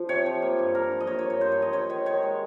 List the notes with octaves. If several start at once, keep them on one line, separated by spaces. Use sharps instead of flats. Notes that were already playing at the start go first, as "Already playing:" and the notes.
Already playing: F3
C3 C#5
F3
A#3
G2
G2 A#4
F3
D#5
A#3 C#5
C#5
G2
C#5
G2 C5
C#5
F3
D#5
D#4 C#5
D#3 C#5
D#3 C#5
G#3